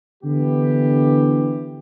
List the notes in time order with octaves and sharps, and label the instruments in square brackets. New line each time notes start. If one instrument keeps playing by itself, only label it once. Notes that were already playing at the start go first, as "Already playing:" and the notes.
[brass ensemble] D3 E3 B3 G4